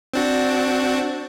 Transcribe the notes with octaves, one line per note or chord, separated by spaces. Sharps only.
C4 D4 F#4